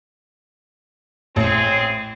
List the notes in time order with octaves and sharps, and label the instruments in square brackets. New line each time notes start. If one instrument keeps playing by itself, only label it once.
[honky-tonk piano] A1 [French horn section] C4 G#4